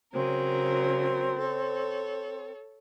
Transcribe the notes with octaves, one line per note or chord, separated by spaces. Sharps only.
C#3 F#3 C4 A#4
A4 C#5